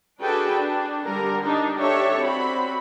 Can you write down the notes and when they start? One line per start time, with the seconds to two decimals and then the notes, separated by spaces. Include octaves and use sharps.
0.21 D4 F#4 G#4 A4 B4 G5
0.53 D4
1.05 D3 G3 A#4
1.43 D4 D#4
1.77 D4 G4 A4 C#5 D5 E5
2.19 C4 F#4 B5